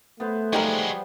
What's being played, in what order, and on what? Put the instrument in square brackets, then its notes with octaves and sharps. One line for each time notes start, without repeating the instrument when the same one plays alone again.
[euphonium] A3 [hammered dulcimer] B3 C5
[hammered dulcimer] F3 G3 [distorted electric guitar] G#3 F#4 [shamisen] D#4 G4 A#4